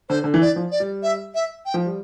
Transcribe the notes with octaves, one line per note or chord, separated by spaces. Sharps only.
D3 C5
D3
E3
D5
F3
D5
G3
E5
E5
G5
F3
G3